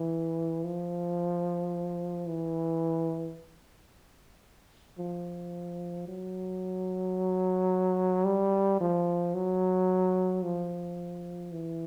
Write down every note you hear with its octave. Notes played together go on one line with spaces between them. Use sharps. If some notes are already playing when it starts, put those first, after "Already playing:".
Already playing: E3
F3
E3
F3
F#3
G3
F3
F#3
F3
E3